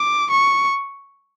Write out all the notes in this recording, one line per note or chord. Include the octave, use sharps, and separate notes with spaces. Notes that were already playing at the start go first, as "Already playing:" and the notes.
Already playing: D6
C#6